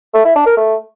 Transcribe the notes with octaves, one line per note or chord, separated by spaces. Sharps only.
A3
E4
D4
A#4
A3